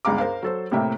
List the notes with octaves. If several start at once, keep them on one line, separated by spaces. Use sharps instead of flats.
G1 C#2 F5 A#5 D6
A#4 C5 F5
F#3 A4 C5
A2 C3 A#3 G4 E5